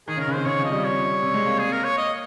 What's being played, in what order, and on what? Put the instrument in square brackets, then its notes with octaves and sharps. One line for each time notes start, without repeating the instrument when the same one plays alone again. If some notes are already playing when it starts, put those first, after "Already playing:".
[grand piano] D#3 [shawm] G#4
[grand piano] C#3
[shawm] A#4
[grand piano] C#3
[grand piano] C3 [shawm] C5
[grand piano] C#3 [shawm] C#5
[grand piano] F3
[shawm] D#5
[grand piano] G3
[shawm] C#5
[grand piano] C3
G#3
A#3
[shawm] G#4
A#4
C#5
D#5